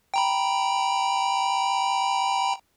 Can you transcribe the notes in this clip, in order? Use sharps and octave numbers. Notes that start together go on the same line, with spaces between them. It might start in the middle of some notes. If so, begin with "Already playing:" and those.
G5 A#5 B5